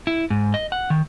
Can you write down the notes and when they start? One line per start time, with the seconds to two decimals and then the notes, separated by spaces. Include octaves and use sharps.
0.07 E4
0.30 G#2
0.54 D#5
0.72 F#5
0.90 D#3